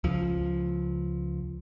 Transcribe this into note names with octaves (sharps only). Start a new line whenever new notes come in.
C#2 F3